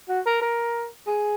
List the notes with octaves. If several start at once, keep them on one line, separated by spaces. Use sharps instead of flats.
F#4
A#4
A#4
G#4